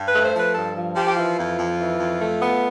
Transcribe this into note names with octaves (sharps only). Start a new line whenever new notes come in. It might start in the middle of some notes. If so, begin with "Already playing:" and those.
Already playing: G2
B4
A3
C5
F3 B4
G2 A4
F3
F3 G4
G4
E3 F4
F2
F2
E3
F2
A3
B3